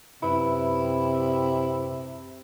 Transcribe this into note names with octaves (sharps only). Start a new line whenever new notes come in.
F#2 C3 E4 B4 B5